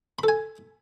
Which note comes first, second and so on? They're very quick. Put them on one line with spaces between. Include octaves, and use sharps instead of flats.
B5 A4 G#5